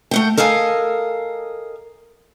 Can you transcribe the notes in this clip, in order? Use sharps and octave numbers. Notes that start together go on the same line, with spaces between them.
A3 F#5 G5
A4 A#4 D#5 F5 G#5